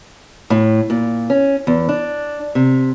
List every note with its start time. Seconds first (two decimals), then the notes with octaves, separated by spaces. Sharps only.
0.50 A2
0.90 A#2
1.30 C#4
1.67 E2
1.89 D4
2.55 C3